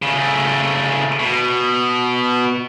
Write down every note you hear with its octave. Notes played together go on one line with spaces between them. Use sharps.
C#3 A3
B2